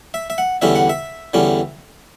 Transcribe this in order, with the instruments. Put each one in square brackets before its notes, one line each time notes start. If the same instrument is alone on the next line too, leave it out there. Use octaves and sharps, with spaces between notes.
[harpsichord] E5
E5
F#5
E2 D3 G3 C#4 E5
F#5
E5
E2 D3 G3 C#4